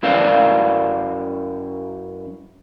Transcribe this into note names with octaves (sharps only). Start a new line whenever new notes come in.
F#2 C#4 E4 B4 D5 F5